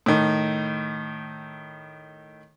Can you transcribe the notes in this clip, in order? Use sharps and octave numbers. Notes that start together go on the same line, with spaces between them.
A2 D#3